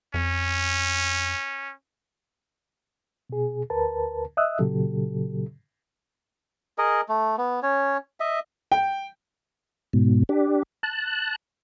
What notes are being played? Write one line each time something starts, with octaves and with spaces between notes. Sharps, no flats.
F2 C#4
B2 G#4
D2 A#4 B4 A5
D#5 E5 D#6 E6 F#6
A#2 C#3 F#3 G4 A4
G#4 A#4 D#5
A3
B3
C#4 C#5
D#5 E5
G5
G#2 B2
D4 G4
A5 F#6